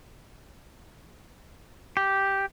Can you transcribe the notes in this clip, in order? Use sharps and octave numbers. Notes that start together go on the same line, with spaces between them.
G4